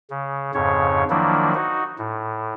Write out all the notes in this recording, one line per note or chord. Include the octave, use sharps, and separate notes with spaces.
C#3
F2 G#2 C#3 C#5
D#3 F3 F#3 A#3 D4 E4
D#4 F#4
A2